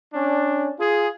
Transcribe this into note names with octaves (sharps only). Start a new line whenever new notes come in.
C#4 D4
F4 G#4